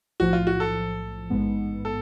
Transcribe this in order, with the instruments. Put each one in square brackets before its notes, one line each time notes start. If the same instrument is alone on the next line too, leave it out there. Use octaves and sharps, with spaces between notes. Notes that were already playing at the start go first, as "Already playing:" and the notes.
[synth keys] B1 A2 F3 [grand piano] F#4
[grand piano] F4
F#4
A4
[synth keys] A1 G#2 G#3 B3
[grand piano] A4